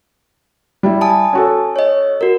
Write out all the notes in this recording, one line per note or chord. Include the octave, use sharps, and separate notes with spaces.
G3 E4
G#5 A5 D#6
C#4 F#4 A4
C#5 D#5
F#4 A#4